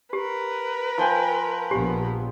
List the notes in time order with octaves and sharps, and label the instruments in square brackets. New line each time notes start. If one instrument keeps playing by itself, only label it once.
[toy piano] G4 [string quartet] A#4 B4
[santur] F3 G5 G#5
[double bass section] A#1 B3 [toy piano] G4